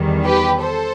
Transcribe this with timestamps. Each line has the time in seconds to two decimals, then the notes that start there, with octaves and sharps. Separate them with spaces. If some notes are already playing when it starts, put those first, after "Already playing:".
Already playing: E2 D#3 G3
0.24 G4 B4
0.62 A4 C5